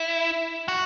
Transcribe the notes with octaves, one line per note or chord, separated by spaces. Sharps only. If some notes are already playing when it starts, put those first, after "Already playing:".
Already playing: E4
F#4